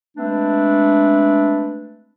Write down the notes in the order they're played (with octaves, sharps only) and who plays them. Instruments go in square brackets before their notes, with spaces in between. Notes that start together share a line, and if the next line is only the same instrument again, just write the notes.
[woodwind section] G#3 A3 C4 D4 B4